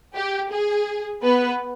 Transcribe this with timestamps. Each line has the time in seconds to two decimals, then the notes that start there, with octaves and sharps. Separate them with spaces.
0.15 G4
0.51 G#4
1.22 B3 B4